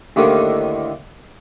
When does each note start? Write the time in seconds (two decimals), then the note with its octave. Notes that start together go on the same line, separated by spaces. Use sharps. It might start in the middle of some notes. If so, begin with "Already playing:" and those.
0.16 D#2 A2 D3 D#3